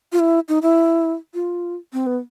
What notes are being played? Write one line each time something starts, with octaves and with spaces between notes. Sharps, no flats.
F4
E4
D#4
E4
F4
C4
B3